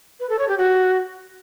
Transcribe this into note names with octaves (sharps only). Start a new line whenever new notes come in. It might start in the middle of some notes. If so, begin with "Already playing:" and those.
B4
A4
C#5
G4
F#4